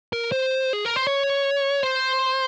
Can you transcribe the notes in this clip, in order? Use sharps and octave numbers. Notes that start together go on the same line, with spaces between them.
A#4
C5
G#4
A#4
C5
C#5
C5